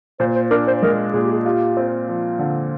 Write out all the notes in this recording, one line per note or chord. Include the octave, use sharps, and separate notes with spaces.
A#2 C5
C5
D4 A#4
C5
G#3 A#4
A#2 G#4
G4
G#4
F4 G4
C4
F3
D3